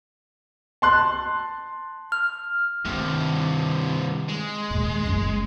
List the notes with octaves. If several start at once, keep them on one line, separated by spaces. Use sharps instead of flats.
A5 C6 F#6
F6
G2 C3 D#3
G#3
D#2 A#2
F#1 F#2